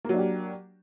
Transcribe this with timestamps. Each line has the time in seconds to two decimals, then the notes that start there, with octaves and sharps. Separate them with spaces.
0.04 A#3
0.09 F#3
0.14 D4
0.19 G4